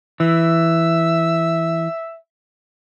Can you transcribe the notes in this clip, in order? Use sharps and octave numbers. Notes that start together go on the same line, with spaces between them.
E3 E5